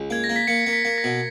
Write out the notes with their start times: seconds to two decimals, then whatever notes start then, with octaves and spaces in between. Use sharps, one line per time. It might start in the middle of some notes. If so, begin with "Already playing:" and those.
Already playing: C#2
0.10 A#3 G#6
0.24 A#6
0.29 A#3
0.36 B6
0.47 A#3 C#7
0.66 A#3
0.73 B6
0.85 A#3
0.98 A#6
1.04 B2